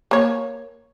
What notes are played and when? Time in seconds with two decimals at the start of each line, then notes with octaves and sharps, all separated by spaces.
0.11 A#3 C#5